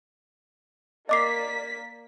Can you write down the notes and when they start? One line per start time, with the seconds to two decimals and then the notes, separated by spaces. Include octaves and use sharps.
1.09 A#3 D5 D#5 D6 B6 C7